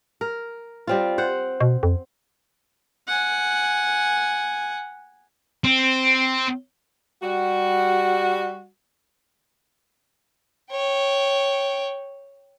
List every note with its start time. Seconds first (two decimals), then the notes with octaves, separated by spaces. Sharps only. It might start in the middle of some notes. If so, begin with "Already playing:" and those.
0.21 A#4
0.87 G3 C4 F4
1.18 C5 F#5
1.61 B2
1.83 F2
3.08 F#5 G#5
5.64 C4
7.22 G3 F#4
10.71 C#5 G5